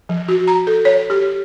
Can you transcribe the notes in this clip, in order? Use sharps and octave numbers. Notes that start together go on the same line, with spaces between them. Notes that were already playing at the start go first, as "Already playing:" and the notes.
F3
F#4
A#5
A4
C#5
G4